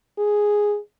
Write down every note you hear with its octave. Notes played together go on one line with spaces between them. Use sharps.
G#4